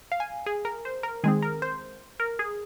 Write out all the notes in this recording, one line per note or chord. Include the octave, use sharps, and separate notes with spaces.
F5
G#5
G#4
A#4
C5
A#4
D#3 G#3 C4 G#4
A#4
C5
A#4
G#4